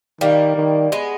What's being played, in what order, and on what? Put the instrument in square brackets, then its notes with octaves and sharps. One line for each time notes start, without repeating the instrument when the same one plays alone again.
[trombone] D#3 [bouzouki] G3 A#3
[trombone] D#3
[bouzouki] G#3 B3